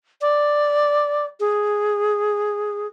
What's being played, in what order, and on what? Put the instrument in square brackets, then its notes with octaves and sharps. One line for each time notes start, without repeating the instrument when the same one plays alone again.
[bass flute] D5
G#4